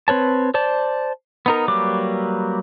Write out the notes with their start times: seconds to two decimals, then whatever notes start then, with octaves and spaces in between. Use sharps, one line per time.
0.08 C4 B4 C#5 A5
0.54 C5 D5 A5
1.46 B3 D#4 A#4
1.68 F#3 G3 A#3 B4 D6